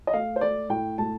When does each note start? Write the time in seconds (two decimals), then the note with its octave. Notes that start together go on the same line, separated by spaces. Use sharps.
0.07 D#5
0.13 A3 F5
0.36 C5
0.41 A3 D5
0.69 A2 G5
0.98 A2 A5